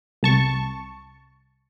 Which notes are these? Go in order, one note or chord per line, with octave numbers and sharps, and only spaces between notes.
C2 A5 C#6